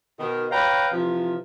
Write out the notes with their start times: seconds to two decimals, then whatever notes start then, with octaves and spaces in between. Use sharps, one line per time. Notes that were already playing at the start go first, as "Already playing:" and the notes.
0.19 B2 D#3
0.51 B4 C#5 F5 G5 A#5
0.91 C3 E3 F3